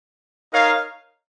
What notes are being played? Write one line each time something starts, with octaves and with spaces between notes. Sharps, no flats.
D#4 A#4 C#5 F5